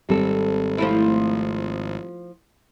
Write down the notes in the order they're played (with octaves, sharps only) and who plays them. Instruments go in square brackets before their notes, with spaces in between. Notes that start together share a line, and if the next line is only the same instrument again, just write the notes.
[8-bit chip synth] G#1 [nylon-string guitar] G3 C4 A4
[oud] F3 A3 E4